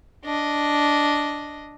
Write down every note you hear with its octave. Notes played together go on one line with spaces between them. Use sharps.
D4 D#5